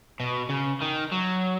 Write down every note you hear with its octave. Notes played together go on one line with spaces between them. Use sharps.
B2
C#3
D#3
F#3